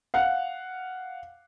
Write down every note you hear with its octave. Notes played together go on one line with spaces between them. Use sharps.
F5 F#5 F#6